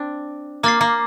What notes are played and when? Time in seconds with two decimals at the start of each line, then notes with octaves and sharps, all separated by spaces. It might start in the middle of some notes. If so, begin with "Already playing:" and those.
Already playing: C4 D4
0.63 A#3 D6 F6 A6 C7
0.81 A#3